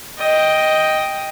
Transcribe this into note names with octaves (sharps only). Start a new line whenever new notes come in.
D#5 G5